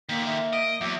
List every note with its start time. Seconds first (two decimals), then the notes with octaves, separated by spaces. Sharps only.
0.09 D3 D#3 A#3 B6
0.26 E5
0.53 D#5 D7
0.81 E2 F#3 E5 D6